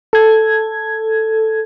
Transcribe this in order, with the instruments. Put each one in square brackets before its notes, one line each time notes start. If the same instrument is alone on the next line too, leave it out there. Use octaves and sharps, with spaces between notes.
[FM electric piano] A4 G#6